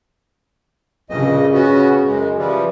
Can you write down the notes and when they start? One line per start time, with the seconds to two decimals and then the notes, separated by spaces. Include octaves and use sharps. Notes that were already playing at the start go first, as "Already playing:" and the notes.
1.10 G2 A#2 C#3 D#5
1.53 B3 C#4 F#4
2.07 F#2 G#3
2.38 E3 F3 G3